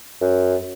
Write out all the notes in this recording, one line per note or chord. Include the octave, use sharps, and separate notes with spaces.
F#2